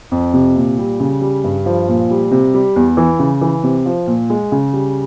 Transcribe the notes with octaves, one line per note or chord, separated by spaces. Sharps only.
F2
C3
A#2
G3
C#3
G3
G2
F3
A#2
G3
C3
G3
E2
E3
C#3
E3
C3
F3
A#2
G#3
C#3
G3